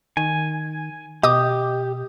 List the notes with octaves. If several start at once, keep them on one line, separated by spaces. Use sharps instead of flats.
D#3 G#5
B2 G4 D#5 D6 D#6